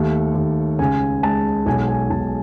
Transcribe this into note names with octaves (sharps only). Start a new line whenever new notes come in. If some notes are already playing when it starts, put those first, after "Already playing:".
Already playing: D#2 A3
D#2
C#2 G#5
G#3 A5
B1 G#5
G#5
B1 A5